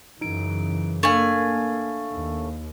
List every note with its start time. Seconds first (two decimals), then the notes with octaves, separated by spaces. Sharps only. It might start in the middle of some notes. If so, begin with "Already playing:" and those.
0.21 F#2 C#3 E3 D#4 D7
1.03 A3 A#3 D4 F5 G#5
2.14 D#2